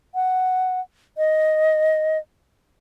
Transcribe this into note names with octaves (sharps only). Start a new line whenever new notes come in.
F#5
D#5